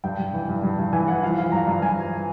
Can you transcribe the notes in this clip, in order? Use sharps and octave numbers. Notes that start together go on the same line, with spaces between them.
G2 G5
G2
E3
G2
G2
G2
E3 G#5
E3 F#5
F3 F5
F3 F5
G2 A#5
G2
G2 G#5
F3